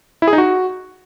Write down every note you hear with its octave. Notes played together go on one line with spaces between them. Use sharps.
E4
G#4
D#4
F#4